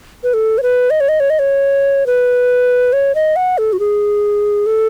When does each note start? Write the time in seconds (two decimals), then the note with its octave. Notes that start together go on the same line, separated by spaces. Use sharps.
0.24 B4
0.34 A4
0.58 C#5
0.63 B4
0.90 D#5
1.00 C#5
1.09 D#5
1.20 C#5
1.30 D#5
1.39 C#5
2.06 B4
2.93 C#5
3.15 D#5
3.36 F#5
3.58 A4
3.73 F#4
3.80 G#4
4.66 A4